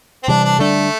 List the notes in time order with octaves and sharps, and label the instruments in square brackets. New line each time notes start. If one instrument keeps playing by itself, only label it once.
[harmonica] C4
[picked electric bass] C3 E3 G3 [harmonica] D4
[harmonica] D4
[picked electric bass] D3 G3 D4 [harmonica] A3